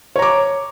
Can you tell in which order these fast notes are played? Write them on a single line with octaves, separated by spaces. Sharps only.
C#5 A#5 D6